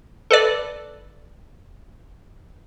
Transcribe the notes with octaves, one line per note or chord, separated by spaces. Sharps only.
A4 B4 D5